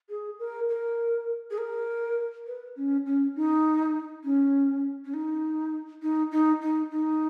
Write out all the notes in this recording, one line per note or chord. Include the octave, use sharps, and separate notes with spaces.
G#4
A#4
A#4
G#4
A#4
B4
C#4
C#4
D#4
C#4
C#4
D#4
D#4
D#4
D#4
D#4